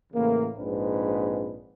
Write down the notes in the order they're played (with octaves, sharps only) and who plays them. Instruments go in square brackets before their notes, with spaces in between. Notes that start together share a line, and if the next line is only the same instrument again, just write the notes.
[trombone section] A2 C#3 E3 A#3
A#1 G#2 C4 D4 B4